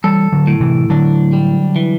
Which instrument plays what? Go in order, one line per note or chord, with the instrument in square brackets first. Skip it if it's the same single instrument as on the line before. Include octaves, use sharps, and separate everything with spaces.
[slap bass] E3 G3 [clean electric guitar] A4
[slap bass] D3 F#3
[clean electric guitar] A2
[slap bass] C3 E3
[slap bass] D3 F#3 [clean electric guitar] D4
[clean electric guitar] G3
E3